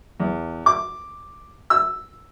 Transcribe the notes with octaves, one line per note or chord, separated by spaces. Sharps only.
E2
D6
E6